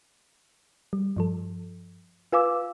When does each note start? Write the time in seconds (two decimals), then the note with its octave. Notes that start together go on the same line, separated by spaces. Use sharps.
0.93 G3
1.17 G2 F3 A4
2.32 F4 B4 F5 G#5 D6 E6